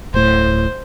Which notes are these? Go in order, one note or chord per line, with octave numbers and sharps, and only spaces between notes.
D1 A2 C5